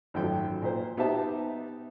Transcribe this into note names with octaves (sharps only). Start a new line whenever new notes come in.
G#1 F#2 F3 A3 G5
A#2 C5
B3 D#4 G4 C5 E5 A5